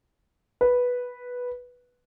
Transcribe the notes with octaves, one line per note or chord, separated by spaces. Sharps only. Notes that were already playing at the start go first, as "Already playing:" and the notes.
B4